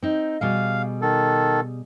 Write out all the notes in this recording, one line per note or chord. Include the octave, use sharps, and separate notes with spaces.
C4 D#4
B2 G3 G#4 F5
D#3 A4